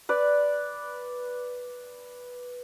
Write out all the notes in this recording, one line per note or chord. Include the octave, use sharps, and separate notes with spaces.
B4 D5